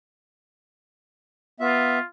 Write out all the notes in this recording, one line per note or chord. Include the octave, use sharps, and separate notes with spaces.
B3 F4 E5